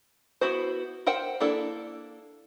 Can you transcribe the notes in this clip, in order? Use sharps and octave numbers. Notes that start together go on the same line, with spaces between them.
B3 E4 F#4 C5
A#4 C5 F#5 G5
A#3 D4 E4 A4